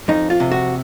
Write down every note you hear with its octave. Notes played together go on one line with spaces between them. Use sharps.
F2 D#4
F4
C3
F#4